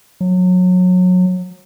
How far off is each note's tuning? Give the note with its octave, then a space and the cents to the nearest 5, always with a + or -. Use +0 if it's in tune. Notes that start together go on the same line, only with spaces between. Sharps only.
F#3 -25